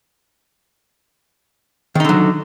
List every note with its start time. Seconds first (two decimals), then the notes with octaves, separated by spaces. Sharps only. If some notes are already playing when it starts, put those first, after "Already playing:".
1.95 D#3
2.00 D#4
2.04 D3
2.09 F#3